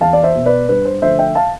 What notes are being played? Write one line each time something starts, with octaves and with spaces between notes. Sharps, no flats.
E2 F5 A5
D5
C5 E5
B2 B3
B4 D5
G2 B4
C5
D3 F3 A3 C5 E5
E5 G5
F5 A5